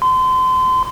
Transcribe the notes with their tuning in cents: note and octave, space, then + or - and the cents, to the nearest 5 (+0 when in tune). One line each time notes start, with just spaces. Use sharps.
C6 -30